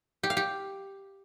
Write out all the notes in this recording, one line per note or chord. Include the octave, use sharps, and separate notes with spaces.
G4
F5
G4